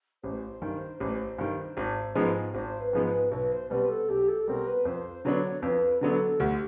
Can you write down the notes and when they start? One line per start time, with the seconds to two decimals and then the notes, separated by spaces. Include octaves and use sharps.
0.23 A1 C5
0.62 G2 D#3
1.00 A1
1.38 G2 D#3
1.77 G#1
2.15 G#2 F3 G#3 B3
2.54 G#1 C5
2.80 B4
2.93 G#2 F3 G#3 B3
3.06 B4
3.31 B1 B4
3.51 C5
3.70 B2 G3 C4 B4
3.89 A4
4.09 B1 G4
4.28 A4
4.47 B2 G3 C4 A#4
4.67 B4
4.85 F2 C5
5.24 D3 F#3 B3 D4 C#5
5.62 F2 B4
6.01 D3 F#3 B3 D4 A4
6.40 D2 G4